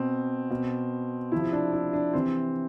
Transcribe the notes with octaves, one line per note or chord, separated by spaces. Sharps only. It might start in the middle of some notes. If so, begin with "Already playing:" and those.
Already playing: B2 C4
B2
C3 F3 E4
D4
E4
D4
C3 E3 C4